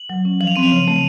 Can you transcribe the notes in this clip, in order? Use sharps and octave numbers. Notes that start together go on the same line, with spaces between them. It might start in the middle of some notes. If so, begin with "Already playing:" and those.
Already playing: F#7
F#3
C#4
F3 F#7
F7
C4 D#7
F7
C#3
A3